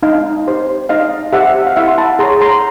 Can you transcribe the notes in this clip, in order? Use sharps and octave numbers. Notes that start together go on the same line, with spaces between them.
D#4 D#5 F5
G4 C5
D#4 D#5 F5
G4 C5 E5 F#5
F5
E4 E5 F#5
C6
A5 B5
G#4 C#5 A#5 C6
A#5 C6